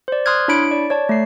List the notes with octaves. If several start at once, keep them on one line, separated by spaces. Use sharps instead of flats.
C5 D5
C6 D#6 F6 F#6 G#6
D4 E4 C#5 B5 C#7 D7
D5
C#5 D5 A5
A3 C7